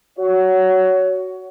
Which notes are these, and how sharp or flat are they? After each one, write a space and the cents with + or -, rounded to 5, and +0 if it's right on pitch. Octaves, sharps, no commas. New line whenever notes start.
F#4 +10 C#5 +20